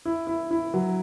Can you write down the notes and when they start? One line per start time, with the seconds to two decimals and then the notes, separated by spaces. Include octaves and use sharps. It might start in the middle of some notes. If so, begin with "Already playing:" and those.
0.05 E4
0.27 E4
0.51 E4
0.74 F#3